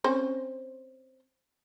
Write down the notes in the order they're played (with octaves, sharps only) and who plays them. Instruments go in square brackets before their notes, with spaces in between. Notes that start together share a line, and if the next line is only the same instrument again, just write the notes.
[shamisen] C4 C#4 C5